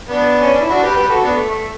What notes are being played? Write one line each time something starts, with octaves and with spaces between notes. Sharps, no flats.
B3 D4
C#4
D4
E4
D4 F#4
G4 B4
G4 B4
F#4 A4
B3 D4
A3
A3